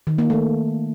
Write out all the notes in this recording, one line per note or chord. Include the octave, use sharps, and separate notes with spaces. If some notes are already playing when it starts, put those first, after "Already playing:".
D#3
A#3
A3